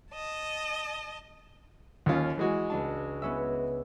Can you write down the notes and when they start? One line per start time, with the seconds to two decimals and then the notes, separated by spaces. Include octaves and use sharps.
0.14 D#5 A5
2.06 D#2 C#4 F4
2.37 E3 G#3 F#4
2.70 C#2 D4 A5
3.22 B3 C#4 E5